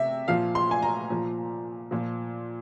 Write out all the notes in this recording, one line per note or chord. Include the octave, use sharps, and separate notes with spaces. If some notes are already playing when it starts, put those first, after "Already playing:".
Already playing: C3 E5
A#2 F3 F5
C6
G#5
A#5
A#2 F3
A#2 F3